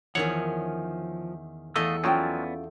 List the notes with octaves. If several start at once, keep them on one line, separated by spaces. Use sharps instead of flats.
E2 D#3 F3 C#4 C#5 F#5
E2 A3 A4 D#5 F5 D#6 E6
F3 F#3 B3 C#4 F4 D5 G5 G#5